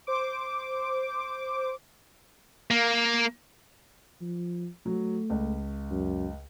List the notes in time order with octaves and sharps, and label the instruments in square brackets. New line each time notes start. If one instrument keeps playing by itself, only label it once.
[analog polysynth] C5 D6
[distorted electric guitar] A#3
[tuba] F3
[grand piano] F#3 [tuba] A3
[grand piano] C#2
[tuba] F#2